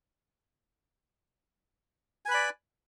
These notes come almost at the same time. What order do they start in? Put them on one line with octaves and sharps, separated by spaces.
G#5 B4 B5 D5